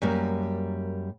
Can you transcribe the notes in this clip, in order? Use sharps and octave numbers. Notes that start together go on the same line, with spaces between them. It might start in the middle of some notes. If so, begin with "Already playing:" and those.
F#2 G3 A#3